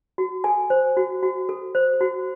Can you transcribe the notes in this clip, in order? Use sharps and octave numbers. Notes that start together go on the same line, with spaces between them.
F#4
A4 G#5
C5
F#4
F#4
A4
C5
F#4